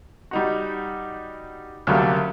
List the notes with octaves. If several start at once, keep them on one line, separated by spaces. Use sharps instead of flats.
G3 D#4 F#4
D2 C#3 F#3 G3 A3 A#3